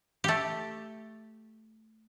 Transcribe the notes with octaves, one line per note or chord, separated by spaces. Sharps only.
A3 G4